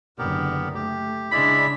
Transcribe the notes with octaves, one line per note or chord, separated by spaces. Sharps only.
F#1 D3 B3 G4 A#4
A3 G4
C#3 G#3 D4 E4 D5 B5